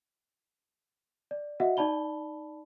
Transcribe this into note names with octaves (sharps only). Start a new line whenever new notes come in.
D5
F#4 D#5 E5 F#5
D#4 D5 A5 B5 G7